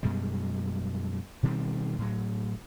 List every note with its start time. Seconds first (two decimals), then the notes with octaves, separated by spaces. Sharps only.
0.03 F#2 B2 G3 G#3
1.43 B2 D#3 G3 C4
1.98 A2 F#3